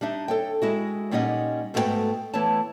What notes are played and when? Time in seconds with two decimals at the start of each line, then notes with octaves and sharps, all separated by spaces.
0.01 G3 D4 D#4 E5
0.28 A4 C#5 G5
0.62 G#3 E4 F#4
1.11 A#2 G3 C#4 D#4 D#5 F#5
1.74 G#2 A3 B3 E4 F#4 G5
2.34 E3 A3 B3 E4 C#5 A5